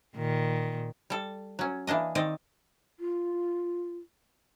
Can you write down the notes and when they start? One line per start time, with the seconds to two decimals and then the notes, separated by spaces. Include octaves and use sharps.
0.15 A#2 D#3
1.10 G3 A4
1.59 F#3 C#4
1.87 E3 A#3 D4 D#5
2.15 D#3 C4 D5 D#5
3.00 F4